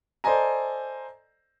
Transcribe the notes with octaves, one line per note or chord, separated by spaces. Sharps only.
A4 C5 D5 D#5 G#5 A#5